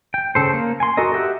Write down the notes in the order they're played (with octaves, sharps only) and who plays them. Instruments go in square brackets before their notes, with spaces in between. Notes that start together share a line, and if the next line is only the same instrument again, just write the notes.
[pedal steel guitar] G5
C#3 A4 C5
A#3
G#5 C6
F#4 A4 A#4 D#5
G4 E5 F#5